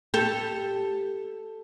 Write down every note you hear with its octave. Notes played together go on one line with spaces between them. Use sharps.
G4 A4